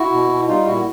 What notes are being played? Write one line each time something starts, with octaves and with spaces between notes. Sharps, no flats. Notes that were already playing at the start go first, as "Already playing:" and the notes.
Already playing: E4 F#4
B2
B2
G3 D#4 F4
A#2 E4 F#4